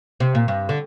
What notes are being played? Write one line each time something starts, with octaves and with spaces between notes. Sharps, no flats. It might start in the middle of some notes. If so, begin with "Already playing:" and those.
C3
A#2
G2
D3